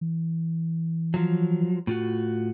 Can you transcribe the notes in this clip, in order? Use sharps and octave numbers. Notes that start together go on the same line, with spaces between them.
E3
F3 F#3
A2 F4 F#4